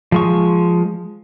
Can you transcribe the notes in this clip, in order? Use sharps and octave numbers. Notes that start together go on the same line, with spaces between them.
F3 G#3 C#6